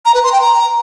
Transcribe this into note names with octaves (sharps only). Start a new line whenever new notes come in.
A#5
B4
C6
G5
A#5